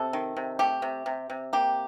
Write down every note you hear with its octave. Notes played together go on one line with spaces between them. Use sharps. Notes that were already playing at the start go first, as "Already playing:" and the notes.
Already playing: C3 A4
D#3
C3
A3 G4
C3
C3
C3
A#3 G4